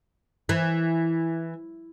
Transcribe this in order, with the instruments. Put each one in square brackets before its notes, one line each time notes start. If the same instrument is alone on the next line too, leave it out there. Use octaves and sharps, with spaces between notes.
[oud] E3